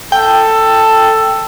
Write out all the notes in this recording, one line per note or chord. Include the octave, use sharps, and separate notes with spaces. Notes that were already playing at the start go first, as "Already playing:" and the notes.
A4 G5